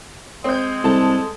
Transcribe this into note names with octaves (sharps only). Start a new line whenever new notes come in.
G#3 C4 G6
C2 A4 A5